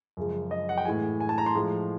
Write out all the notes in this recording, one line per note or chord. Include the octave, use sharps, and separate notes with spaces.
F#2 C#3 F3 G#3
D#5
F#5
G5
A2 E3 G#3 G#5
G#5
A5
A#5
C6
A2 F3 G#3